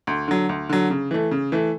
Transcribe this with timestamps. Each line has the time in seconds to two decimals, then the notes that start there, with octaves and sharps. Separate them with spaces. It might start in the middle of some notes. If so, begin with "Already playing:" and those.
0.07 D2
0.28 D3 F#3
0.49 D2
0.69 D3 F#3
0.90 C#3
1.11 E3 A3
1.31 C#3
1.52 E3 A3